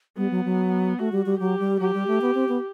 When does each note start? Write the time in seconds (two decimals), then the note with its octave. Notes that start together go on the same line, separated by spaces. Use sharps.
0.17 G3 B3
0.31 F#3
0.45 F#3
0.99 A3 F#4
1.12 G3
1.26 G3
1.39 F#3 G4
1.59 G3
1.80 F#3 G4
1.94 G3
2.07 A3
2.22 B3
2.35 C4
2.49 B3